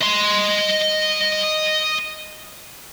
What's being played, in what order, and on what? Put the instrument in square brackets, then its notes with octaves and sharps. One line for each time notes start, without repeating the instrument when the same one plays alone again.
[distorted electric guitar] D#5 C6